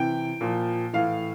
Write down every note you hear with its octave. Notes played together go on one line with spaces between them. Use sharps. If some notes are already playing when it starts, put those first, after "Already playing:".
Already playing: C3 E3 G5
A#2 F3
A2 E3 F5